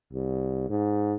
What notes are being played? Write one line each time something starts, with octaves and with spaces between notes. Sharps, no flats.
C2
G#2